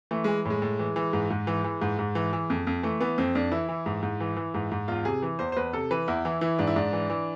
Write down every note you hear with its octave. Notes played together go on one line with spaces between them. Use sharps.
E3 A3
E3 G#3
A2
G#3
A2
E3
E3
G#2
G#2
E3
E3
G#2
G#2
E3
E3
F2
F2
E3 A3
E3 B3
F2 C4
F2 D4
E3 E4
E3
G#2
G#2
E3
E3
G#2
G#2
E2 F4
C3 G#4
E3
E2 C5
C5
E2 B4
C3 A4
E3 B4
E2 E4
E3 E4
E3 E4
G#2 D4
E4
G#2 D4
E3
E3